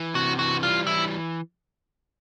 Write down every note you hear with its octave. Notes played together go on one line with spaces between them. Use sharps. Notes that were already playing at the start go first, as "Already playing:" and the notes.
Already playing: E3
C3 F#4
E3 F#4
G3 F4
E3 E4